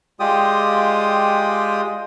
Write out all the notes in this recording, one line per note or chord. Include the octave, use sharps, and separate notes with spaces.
G#3 F4 G4 D5 G5 D#6